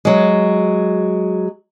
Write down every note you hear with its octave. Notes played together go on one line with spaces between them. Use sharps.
F#3 G#3